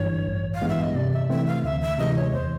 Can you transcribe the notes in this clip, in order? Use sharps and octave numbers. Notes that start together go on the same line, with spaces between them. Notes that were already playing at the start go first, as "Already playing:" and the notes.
Already playing: G1 G2 E3 C#5
A1
F5
G2 E3 G#3 B3
E5
D#5
C3 D5
E5
E3 A3 C4 E5
F5
D2 E5
E5
C3 E3 G#3 D#5
C#5
E2 C5